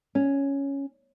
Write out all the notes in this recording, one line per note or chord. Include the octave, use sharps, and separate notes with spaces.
C#4